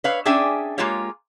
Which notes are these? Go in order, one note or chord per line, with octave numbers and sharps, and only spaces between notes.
B4 C#5 F5
C#4 D4 G#4 E5 G5 G#5
G#3 A#3 F4 G4 C#5 F5